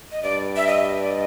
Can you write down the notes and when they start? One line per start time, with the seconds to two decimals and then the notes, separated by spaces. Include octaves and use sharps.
0.12 D#5
0.23 G2 D5
0.56 E5
0.67 D#5
1.00 D5
1.11 D#5